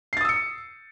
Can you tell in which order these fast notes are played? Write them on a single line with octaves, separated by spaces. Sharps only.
C7 A6 D#6 E6 C#7